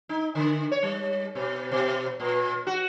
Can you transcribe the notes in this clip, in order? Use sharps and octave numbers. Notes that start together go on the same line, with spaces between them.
D#4
D3
C#5
G3
B2
B2
A#2
F#4